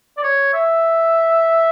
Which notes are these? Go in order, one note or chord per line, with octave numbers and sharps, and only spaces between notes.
D5
C#5
E5